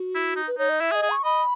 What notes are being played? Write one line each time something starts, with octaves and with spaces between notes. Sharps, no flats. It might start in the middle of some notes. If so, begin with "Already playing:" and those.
Already playing: F#4
E4
D#4
B4
D#4 C#5
D#5
E4 E5
G#4
D#5
G#4
C#6
D#5 B5